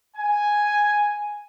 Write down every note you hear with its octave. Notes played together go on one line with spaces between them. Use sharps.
G#5